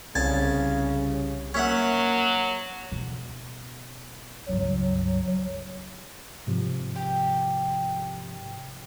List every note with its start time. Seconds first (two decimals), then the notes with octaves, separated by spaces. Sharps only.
0.15 C2 C#3 G#5 A5
1.54 F#3 A#3 C#4 E5 F#5
2.92 B2
4.49 C#2 G2 F#3
6.47 G#2 C3 F3
6.96 G4